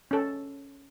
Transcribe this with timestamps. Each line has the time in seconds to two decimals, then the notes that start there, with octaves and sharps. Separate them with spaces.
0.11 C#4 A4